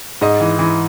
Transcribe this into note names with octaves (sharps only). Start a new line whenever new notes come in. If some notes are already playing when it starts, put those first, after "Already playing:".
G#2 D#5
E3
E3